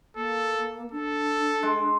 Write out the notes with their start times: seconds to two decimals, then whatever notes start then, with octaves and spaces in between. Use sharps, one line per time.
0.16 A#3 A4
0.91 D4 A4
1.63 G#3